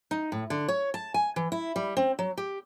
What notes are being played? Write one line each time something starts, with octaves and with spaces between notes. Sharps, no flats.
D#4
A2
D3
C#5
A5
G#5
E3
E4
G3
C4
F#3
G4